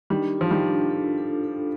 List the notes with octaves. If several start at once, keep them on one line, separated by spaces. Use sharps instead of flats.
D#3 G3 D4
F3 F4
D#3 G3
D4
A4
A4
A4